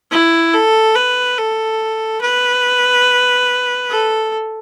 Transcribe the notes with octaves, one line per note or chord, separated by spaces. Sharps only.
E4
A4
B4
A4
B4
A4